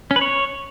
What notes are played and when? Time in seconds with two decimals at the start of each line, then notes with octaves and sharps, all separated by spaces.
0.11 C#4
0.16 B4
0.21 C#5